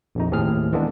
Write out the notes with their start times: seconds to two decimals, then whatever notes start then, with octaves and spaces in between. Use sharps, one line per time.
0.15 A#1 F2 D#4
0.31 D#2 A2 C4 G#4 F6
0.72 D#3 E3 G#3 A#3 B3 D4